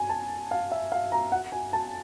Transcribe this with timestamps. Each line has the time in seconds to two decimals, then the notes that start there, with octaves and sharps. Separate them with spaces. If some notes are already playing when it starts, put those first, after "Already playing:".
Already playing: G#5
0.09 A5
0.51 F5
0.72 E5
0.92 F5
1.12 A#5
1.32 F#5
1.52 G#5
1.73 A5